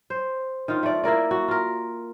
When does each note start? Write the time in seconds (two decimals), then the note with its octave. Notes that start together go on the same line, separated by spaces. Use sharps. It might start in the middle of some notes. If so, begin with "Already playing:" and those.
0.10 C5
0.68 D#3 F4
0.83 A3 D5
1.04 A#3 E4 A#4 D5
1.31 F#4
1.48 F4 A#4